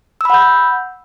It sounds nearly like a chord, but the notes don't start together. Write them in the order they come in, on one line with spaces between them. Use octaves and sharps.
E6 B5 F#5 G6